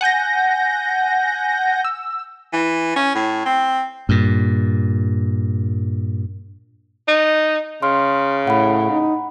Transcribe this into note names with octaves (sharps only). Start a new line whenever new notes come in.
F#5 G#5 G6 A#6
E6
E3
C#4
A2
C4
G2 A#2
D#4
C#3 C6 F6
A2 F#5 B5
D#4